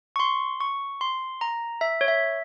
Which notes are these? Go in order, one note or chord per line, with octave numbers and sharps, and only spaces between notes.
C#6
C6
C#6
C6
A#5
E5
C#5
E5